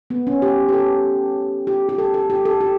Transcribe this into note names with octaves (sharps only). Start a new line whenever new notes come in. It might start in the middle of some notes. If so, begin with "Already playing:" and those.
B3
C#4
G4
G4
A4
G4
G4
A4
A4
G4
A4
G4